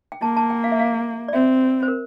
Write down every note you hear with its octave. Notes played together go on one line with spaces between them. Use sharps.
G5
A#3 A5
A5
G5
F5
E5
F5
D5
C4 E5
C5
A#4